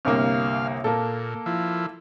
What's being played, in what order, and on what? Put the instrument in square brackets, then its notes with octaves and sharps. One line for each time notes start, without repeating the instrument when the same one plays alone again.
[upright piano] G1 C2 A#3 [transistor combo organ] F5
[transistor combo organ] A#2 [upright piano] A#3 A4
[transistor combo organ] F3 E4